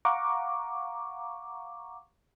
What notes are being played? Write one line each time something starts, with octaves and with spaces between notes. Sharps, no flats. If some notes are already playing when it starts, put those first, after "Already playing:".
F5 F#5 A#5 C#6 D6